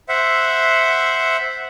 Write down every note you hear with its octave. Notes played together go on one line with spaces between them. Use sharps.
C5 E5 F#5